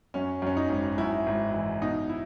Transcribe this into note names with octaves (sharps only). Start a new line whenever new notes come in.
F#2 C#4
F#2 C#4
D#4
G#1
F#2 E4
G#1
E3
B2 D#4
E4